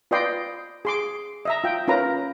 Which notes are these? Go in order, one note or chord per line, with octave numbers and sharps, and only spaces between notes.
F4 B4 D5 D#5 G5 C6
G#4 C6 D6
D#5 E5 A#5
F4 G5
C#4 F4 A#4 B4 A#5